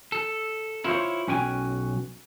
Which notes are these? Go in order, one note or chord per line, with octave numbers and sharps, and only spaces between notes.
A4
E4 F4 A#4 C5 C#5
B1 C#4 F#4 G5 G#5